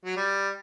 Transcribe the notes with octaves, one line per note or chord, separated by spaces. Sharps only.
F#3
G3